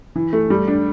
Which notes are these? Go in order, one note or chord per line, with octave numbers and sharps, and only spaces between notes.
E3
A3
G3
D4